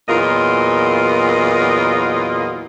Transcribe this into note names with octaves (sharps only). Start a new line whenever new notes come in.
E2 A#2 F#3 F4 A#4 D#5